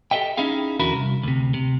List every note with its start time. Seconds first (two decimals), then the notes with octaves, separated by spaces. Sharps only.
0.11 G4 A4 B4 D#5 E5 G5
0.37 C#4 D#4 E4 G#4 F5
0.80 E2 D3 E4 F#4 A#4 B5
0.94 C2
1.23 D2 C3
1.54 C3